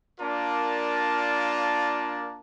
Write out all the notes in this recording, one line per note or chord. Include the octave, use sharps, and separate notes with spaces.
A#3 D4 F4 A#4 D5 A5